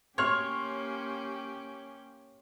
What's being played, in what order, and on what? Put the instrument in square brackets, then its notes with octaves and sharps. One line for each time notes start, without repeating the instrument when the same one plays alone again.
[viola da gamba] A#3 C#4 G4 [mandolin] C#5 [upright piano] C6 F6